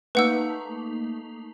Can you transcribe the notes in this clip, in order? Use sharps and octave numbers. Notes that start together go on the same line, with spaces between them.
A3 A#3 D#4 B4 F#5 E6